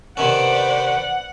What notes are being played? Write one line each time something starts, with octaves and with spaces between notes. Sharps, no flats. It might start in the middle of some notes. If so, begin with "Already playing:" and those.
C3 D#3 C#4 B4 C5 D5 F#5